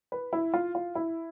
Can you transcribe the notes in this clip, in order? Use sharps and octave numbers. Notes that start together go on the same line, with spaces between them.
B4
E4
F4
F4
E4